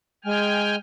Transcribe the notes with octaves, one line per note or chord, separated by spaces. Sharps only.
G#3 G5 G#5 F6